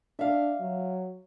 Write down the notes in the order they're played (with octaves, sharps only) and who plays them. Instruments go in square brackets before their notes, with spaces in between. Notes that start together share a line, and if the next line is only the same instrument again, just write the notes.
[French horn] D4 [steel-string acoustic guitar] E5 F5
[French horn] F#3